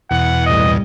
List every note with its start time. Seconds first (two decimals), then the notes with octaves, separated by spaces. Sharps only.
0.11 E2 B2 F#5
0.46 C2 A2 G3 D#5